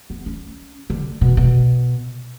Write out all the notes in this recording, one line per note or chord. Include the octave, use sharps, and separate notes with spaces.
B3
C#4
D3
B2
B2